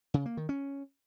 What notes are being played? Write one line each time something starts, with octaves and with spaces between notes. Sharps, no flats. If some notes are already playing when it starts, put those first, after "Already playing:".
C#3
A#3
D#3
C#4